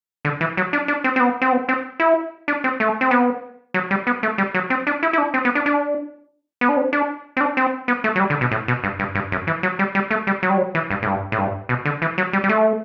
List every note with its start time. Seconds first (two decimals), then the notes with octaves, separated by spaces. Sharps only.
0.25 D3
0.41 E3
0.57 F#3
0.73 D4
0.88 D4
1.04 C4
1.16 C4
1.20 B3
1.42 C4
1.52 B3
1.69 C4
2.00 E4
2.48 D4
2.64 C4
2.80 A3
3.01 C4
3.11 B3
3.74 F#3
3.91 G3
4.07 B3
4.23 A3
4.38 G3
4.54 F#3
4.70 C4
4.87 D4
5.03 E4
5.13 E4
5.18 D4
5.34 C4
5.45 B3
5.55 D4
5.66 D4
6.61 B3
6.69 D4
6.77 C4
6.93 D4
7.37 C4
7.41 D4
7.57 C4
7.88 B3
8.04 A3
8.16 F#3
8.20 G3
8.30 D3
8.41 B2
8.51 A2
8.68 B2
8.84 G2
8.99 G2
9.15 G2
9.32 F#2
9.47 E3
9.63 F#3
9.79 G3
9.95 G3
10.11 A3
10.27 G3
10.43 F#3
10.50 G3
10.57 F#3
10.75 E3
10.90 G2
11.02 A2
11.06 G2
11.32 A2
11.38 G2
11.69 B2
11.85 D3
12.02 E3
12.18 F#3
12.33 G3
12.44 G3
12.49 A3